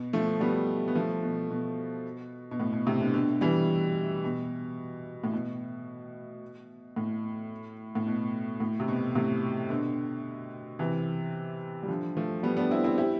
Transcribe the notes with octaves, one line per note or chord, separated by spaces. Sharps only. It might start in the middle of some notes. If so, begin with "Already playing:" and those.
Already playing: B2
F3 A3
G3 B3
B3
F3 A3
B2
B2
B2
A2
B2
A2 C3
B2 D3
B2 D3
E3 G3
B2
A2
B2
A2
A2
B2
A2
C3
B2
A2 C3
B2 D3
C3 E3
G3
D3 F3
F3 A3
G3 B3
B3 D4
C4 E4
C4 E4
E4 G4